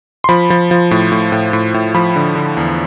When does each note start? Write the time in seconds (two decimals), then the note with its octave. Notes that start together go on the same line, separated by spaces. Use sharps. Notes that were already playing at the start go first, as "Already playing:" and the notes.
0.24 C6
0.29 F3 B5
0.50 F3
0.71 F3
0.91 A2
1.12 A2
1.32 A2
1.53 A2
1.74 A2
1.94 F3 B5
2.16 D3
2.35 D3
2.57 E2